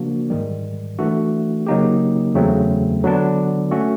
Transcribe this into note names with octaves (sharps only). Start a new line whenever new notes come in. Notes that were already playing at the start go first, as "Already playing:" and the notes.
Already playing: C#3 F3 A#3 D4 F#4
G#2 D#3 G3
E3 A3 D4 F#4
C#3 F#3 A#3 D#4 G4
E2 C#3 F#3 A3 C4
D3 F#3 B3 D4
A3 C#4 F#4